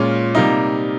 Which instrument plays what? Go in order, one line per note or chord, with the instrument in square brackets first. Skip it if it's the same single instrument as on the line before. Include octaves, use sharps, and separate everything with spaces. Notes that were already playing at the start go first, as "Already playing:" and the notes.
Already playing: [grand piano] A#2 G#3 C#4 [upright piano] F4
[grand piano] C3 G3 A#3 D#4